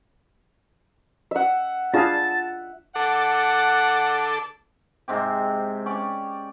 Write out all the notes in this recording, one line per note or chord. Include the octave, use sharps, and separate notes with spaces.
E5 F#5
D4 F4 G#4 F5 A5
A4 F#5 D6
G#2 C3 C4 G4
C#4 G4 D5